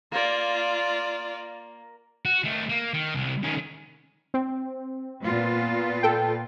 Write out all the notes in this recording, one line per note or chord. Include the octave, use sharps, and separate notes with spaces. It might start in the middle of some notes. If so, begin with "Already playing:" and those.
A#3 F4 D5
F#4
D#3 A3
A#3
D#3
C2
D#3 C#4
C4
A#2 B3 F4
A4 G5